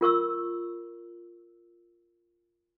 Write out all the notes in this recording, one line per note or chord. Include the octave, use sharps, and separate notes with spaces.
F4 A#4 C#6 E6